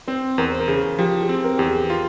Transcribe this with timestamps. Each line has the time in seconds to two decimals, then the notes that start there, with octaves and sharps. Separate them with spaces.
0.08 C4 C5
0.38 E2 A#4
0.52 C5
0.60 A#4
0.68 C#3 G#4
0.99 F3 G4
1.21 G#4
1.29 C4
1.44 A#4
1.57 E2 G4
1.66 G#4
1.90 F4